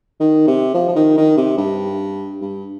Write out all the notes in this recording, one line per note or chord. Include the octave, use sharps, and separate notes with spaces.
D#3
C3
F3
F3
D#3
D#3
C3
G2
G2